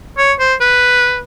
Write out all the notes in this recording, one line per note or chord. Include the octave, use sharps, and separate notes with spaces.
C#5
C5
B4